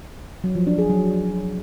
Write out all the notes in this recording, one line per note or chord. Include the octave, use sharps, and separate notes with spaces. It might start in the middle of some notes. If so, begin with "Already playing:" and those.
F#3
F3
D4
G#4
F#3